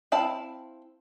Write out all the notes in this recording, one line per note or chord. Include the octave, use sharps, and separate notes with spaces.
C4 E4 F5 A5 B5